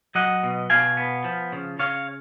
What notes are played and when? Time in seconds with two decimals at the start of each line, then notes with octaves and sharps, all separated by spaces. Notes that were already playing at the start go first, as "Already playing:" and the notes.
0.15 F#3 D#5 F#5
0.43 B2
0.70 B2 F5 G#5
0.97 B3
1.24 F3
1.52 C#3
1.79 C#3 C#5 F5